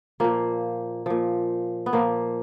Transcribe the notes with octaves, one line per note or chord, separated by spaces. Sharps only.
A#2 F3 A#3
A#2 F3
B3
A#2 F3 A#3